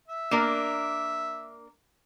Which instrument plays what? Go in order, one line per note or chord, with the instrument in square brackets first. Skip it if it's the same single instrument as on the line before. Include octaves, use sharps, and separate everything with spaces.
[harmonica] E5
[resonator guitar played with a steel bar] A#3 D4 A#4